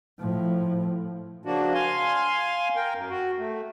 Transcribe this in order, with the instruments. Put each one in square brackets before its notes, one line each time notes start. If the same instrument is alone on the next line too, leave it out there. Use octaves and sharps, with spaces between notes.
[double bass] A2 F3
[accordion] C#3 F3 A#3 D4 F#4
F5 G#5 C6
A#4 G5
F#2
F#4
A3